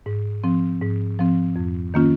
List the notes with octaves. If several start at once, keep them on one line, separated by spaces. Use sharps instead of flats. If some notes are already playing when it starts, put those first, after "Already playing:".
G#2
F3 C4
G#2
F3 C4
F2
D#3 A#3 C#4 F4